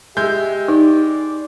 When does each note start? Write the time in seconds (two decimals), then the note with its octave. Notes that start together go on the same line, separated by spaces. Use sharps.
0.17 G#3 G4 E5 G6
0.68 D#4 D5